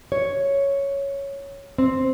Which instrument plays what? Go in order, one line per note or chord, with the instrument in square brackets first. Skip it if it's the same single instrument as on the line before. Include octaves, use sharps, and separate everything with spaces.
[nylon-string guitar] C#5
C4